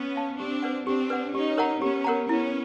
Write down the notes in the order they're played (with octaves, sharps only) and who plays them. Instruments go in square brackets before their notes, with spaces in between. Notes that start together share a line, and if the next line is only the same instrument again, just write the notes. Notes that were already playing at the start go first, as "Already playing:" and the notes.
Already playing: [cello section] B3 C#4
[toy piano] F5 A5
[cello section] C4 D4 [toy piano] G4
[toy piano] B4 D5 F#5
[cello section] C4 D4 [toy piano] G4
[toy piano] B4 D5 F#5
[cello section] C#4 D#4 [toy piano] G4
[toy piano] A#4 C#5 F#5 A#5
[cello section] B3 C#4 [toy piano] G4
[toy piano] A#4 C#5 F#5 A#5
[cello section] B3 C#4 [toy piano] E4